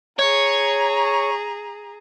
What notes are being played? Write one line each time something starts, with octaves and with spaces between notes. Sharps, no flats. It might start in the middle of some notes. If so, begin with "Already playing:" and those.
G#4 C#5 A#5